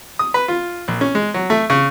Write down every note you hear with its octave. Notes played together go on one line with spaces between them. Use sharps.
D#6
B4
F4
A#1
C#4
G#3
F#3
A3
C#3